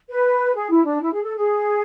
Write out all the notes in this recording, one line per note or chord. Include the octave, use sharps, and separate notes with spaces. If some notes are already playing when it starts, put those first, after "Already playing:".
B4
G#4
E4
D4
E4
G#4
A4
G#4